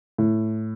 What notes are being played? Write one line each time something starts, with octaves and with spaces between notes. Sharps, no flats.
A2